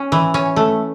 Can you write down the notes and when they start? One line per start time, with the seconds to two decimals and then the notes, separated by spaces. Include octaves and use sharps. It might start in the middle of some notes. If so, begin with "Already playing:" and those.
Already playing: C#4
0.12 E3
0.34 C#4
0.56 A3